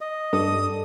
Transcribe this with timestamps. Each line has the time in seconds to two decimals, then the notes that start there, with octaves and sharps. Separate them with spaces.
0.01 D#5
0.33 G2 A4 D5 D#6